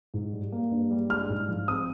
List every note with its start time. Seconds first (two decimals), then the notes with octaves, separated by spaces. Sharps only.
0.14 G#2
0.33 G3
0.52 A#3
0.71 G2
0.91 G3
1.10 G#3 F6
1.29 G#2
1.48 F3
1.68 C4 D#6